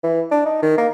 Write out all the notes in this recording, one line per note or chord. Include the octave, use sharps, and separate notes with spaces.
E3
D4
D#4
D#3
A#3